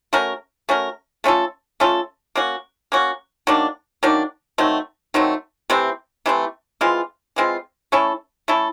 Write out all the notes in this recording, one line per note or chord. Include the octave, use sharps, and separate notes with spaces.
A3 C#4 F#4 A#4
A3 C#4 F#4 A#4
A3 C#4 F4 A4
A3 C#4 F4 A4
A#3 C#4 F#4
A#3 C#4 F#4
D#3 F#3 A#3 D4
D#3 F#3 A#3 D4
D#3 F#3 A3 C4
D#3 F#3 A3 C4
C3 E3 A3 C4
C3 E3 A3 C4
E3 G#3 C4 F4
E3 G#3 C4 F4
A3 C#4 E4 A4
A3 C#4 E4 A4